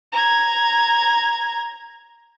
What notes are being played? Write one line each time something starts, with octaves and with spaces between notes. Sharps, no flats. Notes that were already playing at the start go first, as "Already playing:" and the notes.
A#5 G#6